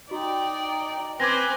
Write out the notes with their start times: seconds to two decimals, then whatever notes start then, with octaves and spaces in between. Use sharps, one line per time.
0.11 D#4 F#4 D5 G5
1.20 C4 B4 G#5 D6 G#6 A#6